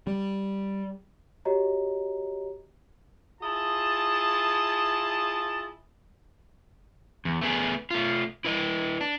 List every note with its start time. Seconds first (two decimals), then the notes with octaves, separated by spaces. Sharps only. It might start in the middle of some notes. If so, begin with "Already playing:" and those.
0.07 G3
1.45 F#4 G4 C#5 D#5 A#5
3.42 E4 F4 G#4 D#5 A5
7.25 E2
7.41 A3 B3 G#4
7.91 A3 F4
8.45 E4 B4 D#5
9.01 D4